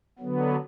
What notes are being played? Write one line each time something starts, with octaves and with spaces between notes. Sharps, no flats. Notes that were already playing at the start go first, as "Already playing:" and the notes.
D3 F#3 B3